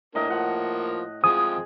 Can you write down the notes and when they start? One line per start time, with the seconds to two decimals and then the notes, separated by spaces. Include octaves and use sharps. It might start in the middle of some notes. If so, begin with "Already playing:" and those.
0.15 A2 A#3 D4 A#4 D#5
0.30 F3 A#3 F#5
1.24 F3 G#3 C4 G#4 D#6